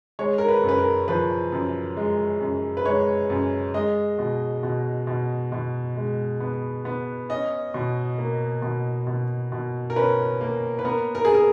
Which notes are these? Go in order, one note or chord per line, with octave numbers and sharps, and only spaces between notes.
G#3 C#5
A#4
B4
F#2
B4
A#4
F3 B4
F#2
G#3
F#2
B4
G#3 C#5
F#2
G#3 D#5
B2
B2
B2
B2
G#3
B3
B3
C#4 D#5
B2
A#3
B2
B2
B2
A#4
C#4 B4
A#3
B4
B3 A#4
A#4
G#4
A#4